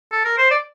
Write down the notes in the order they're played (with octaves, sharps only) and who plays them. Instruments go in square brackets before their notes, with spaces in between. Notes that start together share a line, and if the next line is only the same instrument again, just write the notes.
[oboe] A4
A#4
C5
D5